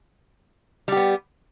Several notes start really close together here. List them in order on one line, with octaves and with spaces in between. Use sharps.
G3 G4 B3